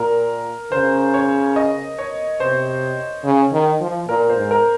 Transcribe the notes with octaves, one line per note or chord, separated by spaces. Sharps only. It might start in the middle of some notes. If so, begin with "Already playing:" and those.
Already playing: A#2 A#4
C#3 C5
C#5
D#5
C#5
C3 C5
C#3
D#3
F3
A#2 A#4
C5
G#2
A#4